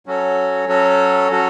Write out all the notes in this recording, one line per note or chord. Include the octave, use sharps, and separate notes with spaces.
F#3 C#4 F#4 A4 C#5
F#3 C#4 F#4 A4 C#5
F#3 C#4 F#4 A4 C#5